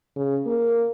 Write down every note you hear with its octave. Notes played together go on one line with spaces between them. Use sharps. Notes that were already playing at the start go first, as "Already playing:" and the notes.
C#3
A#3